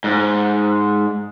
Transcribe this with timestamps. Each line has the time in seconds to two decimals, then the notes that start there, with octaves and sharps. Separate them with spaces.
0.04 G#2